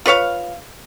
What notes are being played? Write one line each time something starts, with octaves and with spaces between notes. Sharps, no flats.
F4 B4 C#5 F5